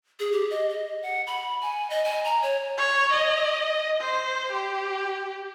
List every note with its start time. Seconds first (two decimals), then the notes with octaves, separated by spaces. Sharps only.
0.20 G#4
0.32 G4
0.50 D#5
0.70 D#5
1.03 F#5
1.27 B5
1.62 G#5
1.90 D#5
2.04 G#5
2.25 A#5
2.43 C#5
2.78 C#5
3.12 D#5
4.00 C5
4.52 G4